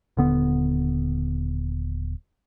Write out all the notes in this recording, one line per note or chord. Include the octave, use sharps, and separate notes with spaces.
D#1 D3 B3